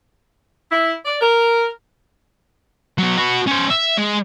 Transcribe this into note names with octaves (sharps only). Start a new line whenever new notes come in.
E4
D5
A#4
F#3 B3
F#4 B4
C#4 C5
E5
G#3